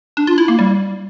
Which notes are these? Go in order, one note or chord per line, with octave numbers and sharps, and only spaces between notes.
D4
F4
E4
A#3
G3